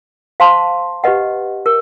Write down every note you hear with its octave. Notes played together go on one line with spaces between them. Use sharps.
C5 F5 A5 C6
G4 B4 D#5 F#5
A#4